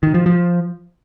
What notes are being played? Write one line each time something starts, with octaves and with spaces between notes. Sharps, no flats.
D#3
F3
F3